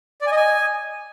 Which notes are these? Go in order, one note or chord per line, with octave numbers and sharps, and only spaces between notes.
D5
G#5
D#5
G#5